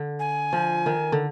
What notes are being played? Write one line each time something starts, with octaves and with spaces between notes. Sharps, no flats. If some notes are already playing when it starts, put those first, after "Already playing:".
Already playing: D3
G#5
F3
D#3
D3